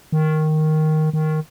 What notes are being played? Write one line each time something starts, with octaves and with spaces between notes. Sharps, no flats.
D#3
D#3